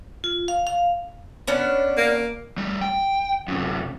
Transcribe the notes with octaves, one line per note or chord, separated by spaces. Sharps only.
F4
F5
F5
B3 C#4 D4
A#3
G3 A3
G5
F#2 C3